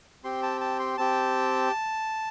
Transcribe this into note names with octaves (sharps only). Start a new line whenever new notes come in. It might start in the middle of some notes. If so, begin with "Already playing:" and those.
C4 G4 C6
A5
A5
C6
C4 G4 A5